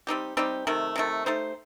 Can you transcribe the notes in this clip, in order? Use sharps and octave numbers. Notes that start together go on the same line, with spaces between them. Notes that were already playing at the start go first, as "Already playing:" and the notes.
G3 C4 D#4 G4
G3 C4 D#4 G4
C3 D#3 A3
C3 D#3 A3
A3 D#4 G4 C5